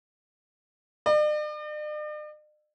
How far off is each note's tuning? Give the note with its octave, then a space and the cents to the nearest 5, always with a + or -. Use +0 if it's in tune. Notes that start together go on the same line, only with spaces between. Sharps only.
D5 +45